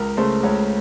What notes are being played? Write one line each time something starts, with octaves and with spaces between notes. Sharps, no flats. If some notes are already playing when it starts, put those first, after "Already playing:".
Already playing: C#2 A#4
C#3 A3 C5
C#2 C#5